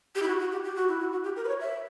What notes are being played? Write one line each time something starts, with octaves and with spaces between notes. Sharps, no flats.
G4
E4
F#4
F#4
G4
G4
F#4
E4
F#4
F#4
G4
A#4
B4
C#5
E5